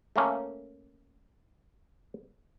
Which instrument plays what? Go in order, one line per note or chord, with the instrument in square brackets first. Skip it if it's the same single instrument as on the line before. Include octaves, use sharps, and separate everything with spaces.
[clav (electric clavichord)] A3 A#3 C#4